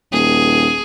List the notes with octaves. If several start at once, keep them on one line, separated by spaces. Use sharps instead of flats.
D#1 G#4